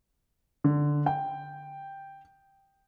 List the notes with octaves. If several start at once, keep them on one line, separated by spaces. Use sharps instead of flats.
D3
G5